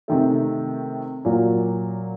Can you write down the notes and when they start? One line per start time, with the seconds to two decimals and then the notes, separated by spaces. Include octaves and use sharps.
0.08 C3 D#3 A3
1.25 A#2 F#3 A#3 F4